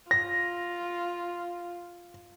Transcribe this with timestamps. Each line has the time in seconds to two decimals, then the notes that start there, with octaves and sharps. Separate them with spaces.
0.11 F4 A#6